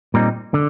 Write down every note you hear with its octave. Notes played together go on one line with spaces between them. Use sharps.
A#2 G3 C4 D#4
D3